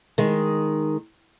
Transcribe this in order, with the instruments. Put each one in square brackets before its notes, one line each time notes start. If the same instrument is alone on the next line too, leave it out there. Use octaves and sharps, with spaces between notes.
[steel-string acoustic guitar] D#3 G#3